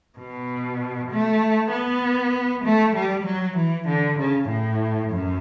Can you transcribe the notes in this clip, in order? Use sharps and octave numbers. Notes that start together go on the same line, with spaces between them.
B2
A3
B3
A3
G3
F#3
E3
D3
C#3
A2
F#2